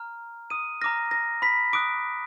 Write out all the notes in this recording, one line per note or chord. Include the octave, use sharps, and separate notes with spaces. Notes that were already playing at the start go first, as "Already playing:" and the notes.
Already playing: A#5 F6
D#6 D#7
A#5 D6 F6 A#6
A#6
B5 B6
B5 D6 D#6 F#6 D7